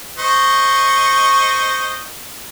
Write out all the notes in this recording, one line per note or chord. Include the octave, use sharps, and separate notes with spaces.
C5 D#5 C#6